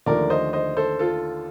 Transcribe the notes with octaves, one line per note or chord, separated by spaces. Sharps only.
D#2 D3 F3 A3 A#4 D5
C5 D#5
C5 D#5
A4 C5
F4 A4